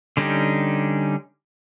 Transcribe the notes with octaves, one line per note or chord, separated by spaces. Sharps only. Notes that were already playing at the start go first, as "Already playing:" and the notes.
D3 G3 C#4 D#4 G4